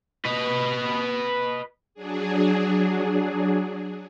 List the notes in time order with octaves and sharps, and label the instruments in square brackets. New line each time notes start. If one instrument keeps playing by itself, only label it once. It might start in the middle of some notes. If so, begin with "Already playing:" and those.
[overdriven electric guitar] B4 D#5
[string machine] F#3 D4 G#4